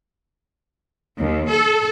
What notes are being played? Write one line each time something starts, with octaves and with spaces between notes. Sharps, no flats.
D#2
A4